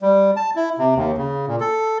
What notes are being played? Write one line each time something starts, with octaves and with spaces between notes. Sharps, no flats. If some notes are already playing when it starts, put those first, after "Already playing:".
G3
A5
E4
C3
D#2
C#3
A#2
A4